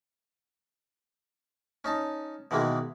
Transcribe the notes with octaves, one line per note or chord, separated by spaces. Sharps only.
C#4 D#4 A5
B2 D#3 E3 G#3 A#3